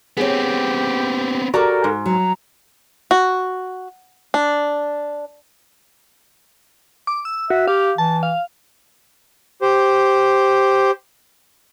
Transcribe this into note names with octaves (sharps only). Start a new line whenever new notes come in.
B3 C4 G4 G#4 C#5
F#4 G4 A4 A#4 D5 A#5
G#2
F#3 A#5
F#4
D4
D6
E6
F#4 E5
G4 F5
E3 A5
F5
G4 C5